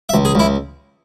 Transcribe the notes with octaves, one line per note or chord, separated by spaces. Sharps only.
E5
C#2
G#4
C#2 E4